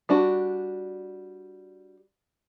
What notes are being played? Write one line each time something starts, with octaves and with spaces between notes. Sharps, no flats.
G3 D4 F#4